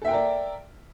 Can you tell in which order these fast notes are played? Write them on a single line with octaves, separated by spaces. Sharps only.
A4 E5 G5 A#4 D5